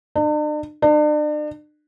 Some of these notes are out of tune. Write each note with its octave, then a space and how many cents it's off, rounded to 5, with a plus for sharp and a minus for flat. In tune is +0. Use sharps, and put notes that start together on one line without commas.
D4 +45
D4 +40